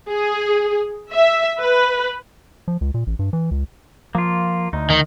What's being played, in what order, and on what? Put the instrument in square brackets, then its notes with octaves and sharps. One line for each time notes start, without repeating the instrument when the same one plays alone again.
[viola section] G#4
E5
B4
[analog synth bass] F3
C#2
A#2
A1
G2
E3
C#2
[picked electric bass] F3 [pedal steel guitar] A#3 F4
[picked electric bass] D2 [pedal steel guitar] D#4
[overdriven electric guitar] D#3